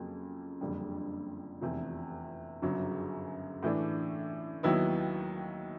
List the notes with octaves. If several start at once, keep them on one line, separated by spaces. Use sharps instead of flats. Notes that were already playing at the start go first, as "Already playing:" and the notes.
Already playing: F2 C#3 F#3 A#3
F#1 F2 D3 G3
F1 E2 C3
G1 F#2 C#3 F#3
A2 E3 A3 D4
D#2 D#3 F#3 B3 E4